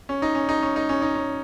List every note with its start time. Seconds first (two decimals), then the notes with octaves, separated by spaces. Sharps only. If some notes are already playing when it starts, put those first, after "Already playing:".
0.09 C#4
0.22 D#4
0.35 C#4
0.49 D#4
0.63 C#4
0.76 D#4
0.89 C#4
1.02 D#4
1.15 C#4